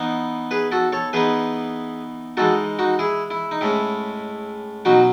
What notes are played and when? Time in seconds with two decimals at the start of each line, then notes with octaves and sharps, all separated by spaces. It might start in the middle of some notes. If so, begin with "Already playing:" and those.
Already playing: E3 B3 D#4
0.51 G#4 B4
0.72 F#4 A4
0.92 A4 C#5
1.13 E3 B3 D#4 G#4 B4
2.37 E3 G#3 D#4 F#4 A4
2.79 D#4 F#4
2.99 E4 G#4
3.31 E4
3.51 D#4
3.61 A2 G#3 C#4 E4
4.85 B2 F#3 C#4 D#4 F#4